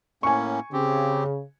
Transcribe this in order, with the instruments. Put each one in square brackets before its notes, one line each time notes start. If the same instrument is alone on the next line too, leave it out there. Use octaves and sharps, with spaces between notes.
[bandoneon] A2 A#3 C#4 [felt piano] G#5 C#6
[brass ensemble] C#3 [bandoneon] C4 G4